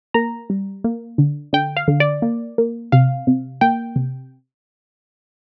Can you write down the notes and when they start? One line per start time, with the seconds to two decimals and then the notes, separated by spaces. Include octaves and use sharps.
0.14 A#3 A#5
0.50 G3
0.84 A#3
1.18 D3
1.53 D3 G5
1.77 F5
1.88 D3
2.00 D5
2.22 A#3
2.58 A#3
2.92 C3 F5
3.27 C3
3.61 A#3 G5
3.96 C3